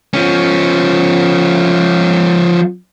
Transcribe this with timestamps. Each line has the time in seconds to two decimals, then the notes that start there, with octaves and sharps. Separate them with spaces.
0.13 F3 C#4